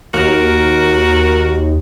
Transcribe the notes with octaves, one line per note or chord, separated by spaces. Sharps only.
D#2 F#4 A#4